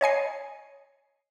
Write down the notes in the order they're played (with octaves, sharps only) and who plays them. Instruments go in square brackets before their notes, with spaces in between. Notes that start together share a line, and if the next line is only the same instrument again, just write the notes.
[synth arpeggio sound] C#5 D#5 G#5 C7